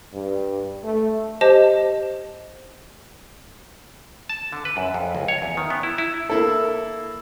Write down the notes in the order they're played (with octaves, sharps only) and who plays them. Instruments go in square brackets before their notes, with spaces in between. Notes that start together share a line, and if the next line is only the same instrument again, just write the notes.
[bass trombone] G2
A3
[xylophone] G4 C5 D#5 A5
[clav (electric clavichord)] A5
D3
B4
F#2
F2
C#2
C#5
E2
D#3
B3
E4
E4
[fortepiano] A#3 E4 A4